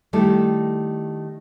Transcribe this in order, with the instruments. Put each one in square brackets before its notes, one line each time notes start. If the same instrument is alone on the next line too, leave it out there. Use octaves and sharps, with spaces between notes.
[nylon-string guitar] D#3 G3 A3 E4 A4